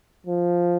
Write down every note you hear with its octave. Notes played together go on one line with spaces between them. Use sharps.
F3